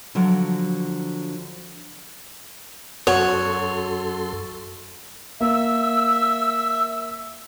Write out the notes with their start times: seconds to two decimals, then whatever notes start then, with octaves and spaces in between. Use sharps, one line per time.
0.15 D3 F3 F#3
3.07 F#2 F#4 A4 C#5 C6
5.41 A#3 E5 E6